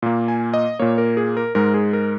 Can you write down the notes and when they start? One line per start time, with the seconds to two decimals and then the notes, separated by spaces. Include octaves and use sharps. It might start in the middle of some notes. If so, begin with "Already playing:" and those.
0.02 A#2 A#3
0.28 G#5
0.54 D#5
0.79 A#2 A#3 C#5
0.98 A#4
1.17 G#4
1.37 A#4
1.55 G#2 G#3 A#4
1.74 G#4
1.93 A#4